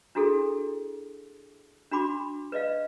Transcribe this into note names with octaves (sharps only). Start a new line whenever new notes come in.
D4 E4 F#4 G#4 A4
D4 F#4 B5 D6
B4 D5 D#5 F5